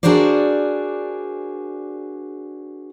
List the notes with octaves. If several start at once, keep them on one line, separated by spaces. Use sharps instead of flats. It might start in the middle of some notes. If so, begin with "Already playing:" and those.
D4 F#4 G#4 A#4 C5 D5